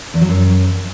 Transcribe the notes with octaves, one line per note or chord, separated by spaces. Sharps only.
E2
F#3
F#2